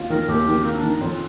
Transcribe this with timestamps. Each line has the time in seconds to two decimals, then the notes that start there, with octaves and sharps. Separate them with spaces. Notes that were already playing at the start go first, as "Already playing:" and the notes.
Already playing: D#2 F4
0.10 D#3 A#4
0.28 D#2 G4
0.47 D#3
0.63 A#3 C4
0.76 D4
0.83 D#3
0.89 D#4
1.01 F2 F4